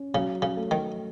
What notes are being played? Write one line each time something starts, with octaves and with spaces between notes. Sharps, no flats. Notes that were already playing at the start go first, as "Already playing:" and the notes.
Already playing: C#4
C#3 F#3
C#3
A3
D#3